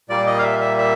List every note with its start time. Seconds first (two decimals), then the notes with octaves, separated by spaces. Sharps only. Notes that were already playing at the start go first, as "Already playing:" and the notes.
0.09 A#2 G3 A#3 D5
0.27 D#5
0.39 F5
0.43 E5
0.61 E5
0.78 E5